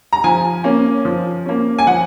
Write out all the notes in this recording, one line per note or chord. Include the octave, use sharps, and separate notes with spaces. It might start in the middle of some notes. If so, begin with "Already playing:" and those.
A#5
F3 G#5
A#3 C#4
F3
A#3 C#4
G#5
F3 F#5